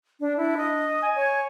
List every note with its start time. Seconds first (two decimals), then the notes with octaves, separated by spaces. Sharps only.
0.20 D4
0.37 D4 E4
0.57 D#5
1.03 G#5
1.16 C#5